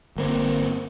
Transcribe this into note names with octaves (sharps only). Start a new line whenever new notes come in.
G1 A#3 C4